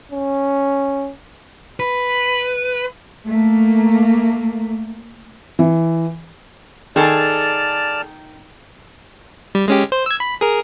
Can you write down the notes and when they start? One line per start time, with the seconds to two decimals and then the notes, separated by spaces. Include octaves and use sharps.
0.11 C#4
1.80 B4
3.27 A3 A#3
5.59 E3
6.96 D#3 G#4 A4 D5 A5 F6
9.55 G3
9.68 G#3 C#4 G4
9.92 C5
10.06 E6 G#6
10.20 B5
10.41 G#4 A#4